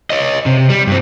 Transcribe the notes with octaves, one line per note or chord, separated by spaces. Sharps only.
C#5 D#5
C3
G3
G2 C4